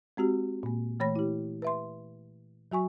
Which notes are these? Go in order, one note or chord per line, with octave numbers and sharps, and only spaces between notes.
G#3 C4 F#4 G4
A#2 A#3
E3 A3 C#5 B5 A#6
E4 G4
B4 E5 C6
F#3 F#4 G#5 C#6